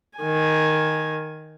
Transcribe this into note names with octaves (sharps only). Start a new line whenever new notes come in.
D#3 G#5